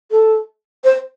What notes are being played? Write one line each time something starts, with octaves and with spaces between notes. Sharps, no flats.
A4
C5